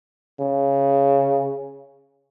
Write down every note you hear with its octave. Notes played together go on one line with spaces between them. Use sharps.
C#3